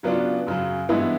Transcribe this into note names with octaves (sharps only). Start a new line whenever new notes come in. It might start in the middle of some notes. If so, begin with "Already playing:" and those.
C#3 F#3 B3 D4 F4
F#2 C#3 F#3
G2 E3 G#3 B3 E4